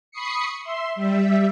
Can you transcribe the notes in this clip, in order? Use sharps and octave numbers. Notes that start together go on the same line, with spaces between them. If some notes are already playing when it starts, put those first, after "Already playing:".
B5 C#6 D#6 C7 C#7
E5 C6
G3 E5